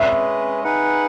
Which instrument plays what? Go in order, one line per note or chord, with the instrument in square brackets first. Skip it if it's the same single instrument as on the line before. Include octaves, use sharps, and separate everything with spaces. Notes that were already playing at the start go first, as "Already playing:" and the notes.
Already playing: [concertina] G#3 C#4 G#4 B4 D#5 [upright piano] E5
[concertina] D#4 G#4 B4 F#5